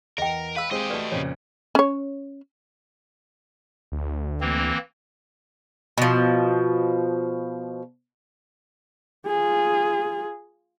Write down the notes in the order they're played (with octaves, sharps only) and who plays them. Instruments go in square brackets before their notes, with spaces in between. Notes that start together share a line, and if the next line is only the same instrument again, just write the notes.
[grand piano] E2 [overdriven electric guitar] A#4 [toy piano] D#5 G5
[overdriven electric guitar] B4 [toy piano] F5 E6
[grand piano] G#3 C4 G#4 [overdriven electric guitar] G4 D#5
[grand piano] A3 F#4 [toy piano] B4 D5
[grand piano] F2 A#2 C#3 [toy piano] C#5
[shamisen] C#4 C#5
[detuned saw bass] D2
[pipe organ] E3 A#3 C4
[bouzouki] B2 F3
[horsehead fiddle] F4 G#4